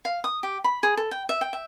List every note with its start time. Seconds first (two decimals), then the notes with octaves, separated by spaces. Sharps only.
0.05 F5
0.24 D#6
0.43 G4
0.64 B5
0.83 G#4
0.97 A4
1.11 G5
1.29 E5
1.41 G5
1.53 E5